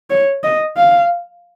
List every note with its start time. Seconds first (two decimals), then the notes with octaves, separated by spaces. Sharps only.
0.10 C#5
0.44 D#5
0.77 F5